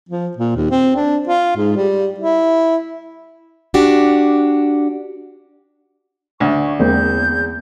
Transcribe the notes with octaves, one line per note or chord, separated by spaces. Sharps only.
F3
A#2
D#2
C4
D4
F4
G#2
G3
E4
D4 F#4 G4
D2 D5 C#6
E2 G#3 A#3 C4 G6